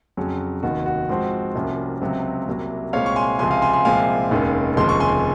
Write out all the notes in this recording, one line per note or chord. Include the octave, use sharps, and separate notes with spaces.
F2 C#3 F#3 C#4
F1 D#2 D#3 F#4
F#4
G#2 F3 C4 F#4
C2 C3 F3 A#3 C#4
C#2 C3 F#3 C4
C2 C3 F#3 A#3
C2 A#2 G#3 C4 C#5 F5
C#6
G#5 C6
C#2 C3 F3 G#3 G#5 C6
F5 G#5
G#5 C6
G#5 C6
C2 A#2 F3 G#3 C4 F5 G#5
F1 D#2 D#3 G#3 C#4
F1 D#2 C#3 F3 G#3 C6
C#6
G#5 C6